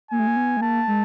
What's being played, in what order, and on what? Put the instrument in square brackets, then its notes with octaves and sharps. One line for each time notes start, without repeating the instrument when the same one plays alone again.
[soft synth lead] A#3 [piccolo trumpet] G#5
[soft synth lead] A3
A#3
B3
A3
[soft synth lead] A#3 [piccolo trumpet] A5
[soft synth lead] G#3